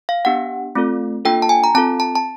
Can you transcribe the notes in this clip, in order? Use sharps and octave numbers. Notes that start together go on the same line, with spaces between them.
F5
B3 D4 G4 F#5
A3 C4 F4 A4
A#3 D4 F4 A4 G5
A5
G#5
A#5
C4 F4 A4 A5
A5
A5